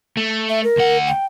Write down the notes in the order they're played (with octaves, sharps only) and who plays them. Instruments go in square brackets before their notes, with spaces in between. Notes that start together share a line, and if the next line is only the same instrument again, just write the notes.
[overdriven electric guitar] A3
[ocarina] E5
A#4
[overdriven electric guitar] D2 F#5
[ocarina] G5